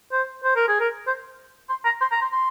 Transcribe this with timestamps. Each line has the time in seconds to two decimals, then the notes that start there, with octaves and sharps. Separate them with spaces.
0.12 C5
0.44 C5
0.56 A#4
0.68 G#4
0.80 A#4
1.07 C5
1.70 C6
1.85 A#5
2.01 C6
2.12 A#5
2.22 C6
2.32 C6